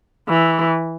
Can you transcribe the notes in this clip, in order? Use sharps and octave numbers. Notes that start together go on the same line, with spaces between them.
E3